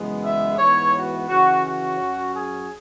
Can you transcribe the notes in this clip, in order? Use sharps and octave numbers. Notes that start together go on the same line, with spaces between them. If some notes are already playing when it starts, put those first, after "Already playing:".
Already playing: F#2 C#3 E3 G#3 B3
E5
G#2 E3 B3 C#5
F#4
C#3 E3 C#4 F#4
F#4
F#2 F#3 C#4
G#4